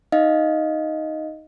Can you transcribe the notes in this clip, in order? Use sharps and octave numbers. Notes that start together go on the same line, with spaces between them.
D#4 D#5 F5